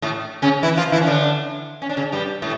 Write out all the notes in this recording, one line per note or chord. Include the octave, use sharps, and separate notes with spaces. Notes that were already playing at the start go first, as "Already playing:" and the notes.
A2 A3
C#3 C#4
E3 E4
F3 F4
E3 E4
C#4
D3 D4
C#4
D4
C#3 C#4
G2 G3
A2 A3